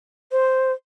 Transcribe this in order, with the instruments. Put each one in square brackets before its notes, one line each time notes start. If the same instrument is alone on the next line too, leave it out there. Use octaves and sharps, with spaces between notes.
[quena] C5